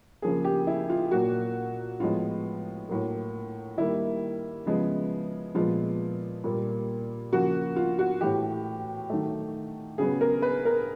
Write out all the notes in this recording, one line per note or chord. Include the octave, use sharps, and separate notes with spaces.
C#3 F3 A#3 G#4
G4
E4
F4
A#2 F#3 A#3 F#4
A2 F3 G#3 B3 F4
A2 F#3 A#3
D#3 G3 A#3 E4
C#3 F3 G#3 B3
A#2 F3 G#3 B3 F4
A#2 G3 A#3
C#3 F3 A#3 F#4
F4
F#4
A2 E3 A3 G4
D#3 F#3 A3
C#3 F#3 B3 G#4
A#4
B4
A#4